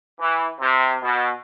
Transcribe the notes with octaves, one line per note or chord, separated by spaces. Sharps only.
E3
C3
B2